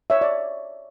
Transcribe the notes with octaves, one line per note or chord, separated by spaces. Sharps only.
C#5 E5
D5